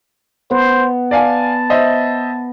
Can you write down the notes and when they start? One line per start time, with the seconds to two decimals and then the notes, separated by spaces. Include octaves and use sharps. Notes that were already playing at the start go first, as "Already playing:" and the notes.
0.51 B3 C5
1.11 D5 F5 G#5 A5
1.70 C5 D#5 E5